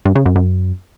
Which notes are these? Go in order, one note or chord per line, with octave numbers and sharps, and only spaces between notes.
G2
C#3
F#2
F#2